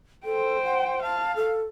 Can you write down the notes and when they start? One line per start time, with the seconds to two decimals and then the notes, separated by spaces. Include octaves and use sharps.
0.25 A4 C5 G5
0.64 F#5
1.02 F5 A5
1.36 A4